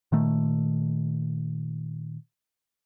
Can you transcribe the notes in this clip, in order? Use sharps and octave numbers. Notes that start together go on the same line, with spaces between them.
A#2 D#3 A3